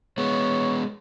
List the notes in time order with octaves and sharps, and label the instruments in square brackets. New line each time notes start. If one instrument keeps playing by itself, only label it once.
[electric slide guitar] G#3 B3 [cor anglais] C#5